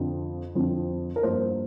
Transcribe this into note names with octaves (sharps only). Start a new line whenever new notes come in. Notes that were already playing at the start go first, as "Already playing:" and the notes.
Already playing: F2 D3 F3 C4
F2 D3 F3 C4
A#4
G2 F3 A#3 C5